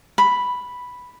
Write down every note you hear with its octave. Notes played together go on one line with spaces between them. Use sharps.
B5